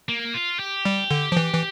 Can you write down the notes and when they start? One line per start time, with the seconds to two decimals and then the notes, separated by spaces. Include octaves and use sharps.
0.09 A#3
0.34 F4
0.59 G4
0.85 G3
1.11 D3
1.32 F3
1.37 E3
1.54 E3